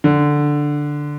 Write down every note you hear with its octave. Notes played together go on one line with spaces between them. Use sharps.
D3